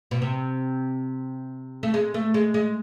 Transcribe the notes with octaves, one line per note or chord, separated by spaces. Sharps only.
B2
C3
A3
G#3
A3
G#3
G#3